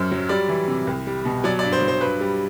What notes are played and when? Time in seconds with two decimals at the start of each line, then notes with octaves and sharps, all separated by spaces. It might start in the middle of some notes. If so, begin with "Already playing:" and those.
Already playing: F#2 F#3 C5
0.11 F#3
0.29 G3 D5
0.48 E3
0.68 C3
0.87 C2
1.07 G3
1.25 B2
1.44 F#3 D5
1.59 D5
1.63 G2
1.72 C5
1.82 F#3
1.88 C5
2.01 G2 B4
2.21 G3